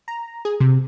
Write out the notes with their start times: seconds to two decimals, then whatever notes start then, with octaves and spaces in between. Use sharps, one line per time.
0.08 A#5
0.45 G#4
0.60 C3